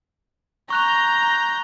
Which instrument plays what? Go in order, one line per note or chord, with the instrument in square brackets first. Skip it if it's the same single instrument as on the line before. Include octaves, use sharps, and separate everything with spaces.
[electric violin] A#5 G6 [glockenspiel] C#6 F#6 F7